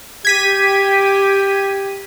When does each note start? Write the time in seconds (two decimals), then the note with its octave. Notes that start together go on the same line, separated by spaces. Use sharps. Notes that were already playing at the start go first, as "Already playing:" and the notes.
0.25 G4 G#6 B6 D#7